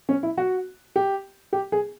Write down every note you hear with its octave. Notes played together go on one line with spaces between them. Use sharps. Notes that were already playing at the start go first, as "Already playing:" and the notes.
C#4
E4
F#4
G4
G4
G#4